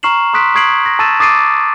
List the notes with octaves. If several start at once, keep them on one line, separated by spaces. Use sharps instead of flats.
A#5 C#6 F6 C7 E7 F#7
C6 D#6 F#6 B6 D7
C#6 D#6 G#6 C7 D7 F#7
A#6
A5 C#6 E6 A6 D#7 E7
D6 D#6 A6 C7 D7 D#7